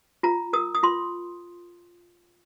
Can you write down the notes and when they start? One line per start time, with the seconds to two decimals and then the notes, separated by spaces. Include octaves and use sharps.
0.23 F4 A#5
0.53 A#4 D#6
0.75 D#6
0.83 F4 C6